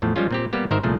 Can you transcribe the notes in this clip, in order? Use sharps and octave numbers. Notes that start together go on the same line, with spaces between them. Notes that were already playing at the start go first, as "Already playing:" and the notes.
E2 A2 F3 A3
F3 G3 G#3 C#4 F4
A#2 C4 G4
G3 A#3 B3 G4
G#1 D#3 A#4 C5 E5
C2 A#2 F3 A3 G#4